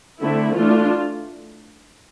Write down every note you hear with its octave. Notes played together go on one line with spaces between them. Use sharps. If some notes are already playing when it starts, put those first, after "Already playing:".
D3 A3 C4 E4
E3 A3 D4 F4